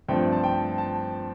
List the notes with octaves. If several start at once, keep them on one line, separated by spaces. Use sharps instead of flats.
G2 F3 A3 C4 G5
A5
G5
A5